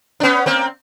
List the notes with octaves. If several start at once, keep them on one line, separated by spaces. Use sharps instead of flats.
D4
B3 C#4
A#3 C4